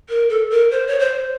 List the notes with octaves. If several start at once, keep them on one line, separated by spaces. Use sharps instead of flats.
A#4
A4
A#4
C5
C#5
C5